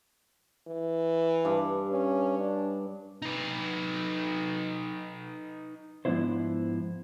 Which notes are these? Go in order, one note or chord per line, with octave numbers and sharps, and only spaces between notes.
E3
G2
C#4
D4
D#4 B4
G#2 F3 B3 D4 E4 C5